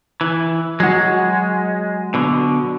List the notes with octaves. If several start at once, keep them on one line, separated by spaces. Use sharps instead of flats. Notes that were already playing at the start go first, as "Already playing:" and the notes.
E3
F#3 G#3 F#4
B2 D3